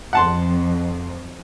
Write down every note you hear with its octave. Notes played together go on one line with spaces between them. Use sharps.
F2 F#5 A5 C6